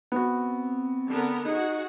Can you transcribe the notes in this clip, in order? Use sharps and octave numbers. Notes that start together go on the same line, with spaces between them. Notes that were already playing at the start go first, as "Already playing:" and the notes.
B3 C4 F#4
D3 B3 A#4
D#4 F#4 G#4 F#5